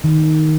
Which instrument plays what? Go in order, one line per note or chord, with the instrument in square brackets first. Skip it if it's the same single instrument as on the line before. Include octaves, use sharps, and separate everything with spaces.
[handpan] D#3